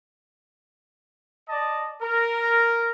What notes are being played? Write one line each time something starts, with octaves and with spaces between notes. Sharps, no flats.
D5 D#5 A5
A#4